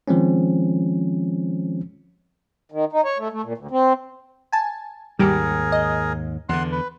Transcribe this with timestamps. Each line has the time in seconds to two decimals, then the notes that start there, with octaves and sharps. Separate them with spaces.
0.08 D#3 F3 G#3 C4 C#4
2.72 D#3
2.93 D#4
3.05 C#5
3.18 A3
3.32 A3
3.43 A#2
3.58 D2
3.71 C4
4.52 G#5 A5
5.19 D#2 G#2 G3 G4 G#4 A#4
5.72 D#5
6.49 E2 D3 F#5 C6
6.72 B4